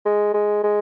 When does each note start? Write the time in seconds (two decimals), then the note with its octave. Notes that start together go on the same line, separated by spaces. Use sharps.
0.05 G#3
0.34 G#3
0.63 G#3